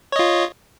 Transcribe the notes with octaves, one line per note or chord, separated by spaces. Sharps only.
F4 C#5 D#5